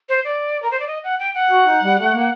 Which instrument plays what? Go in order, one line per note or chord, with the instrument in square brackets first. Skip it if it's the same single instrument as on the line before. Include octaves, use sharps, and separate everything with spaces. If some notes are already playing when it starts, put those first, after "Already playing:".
[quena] C5
D5
A#4
C5
D5
D#5
F#5
G5
F#5
[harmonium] F#4
D#4
G3
A3
A#3